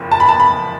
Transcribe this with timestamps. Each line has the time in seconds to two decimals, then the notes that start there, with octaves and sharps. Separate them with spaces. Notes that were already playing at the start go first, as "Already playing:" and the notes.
Already playing: F#1 F2 F3
0.12 A5
0.20 B5
0.29 A5
0.40 B5